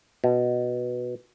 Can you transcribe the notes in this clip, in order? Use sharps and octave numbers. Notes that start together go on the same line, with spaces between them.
B2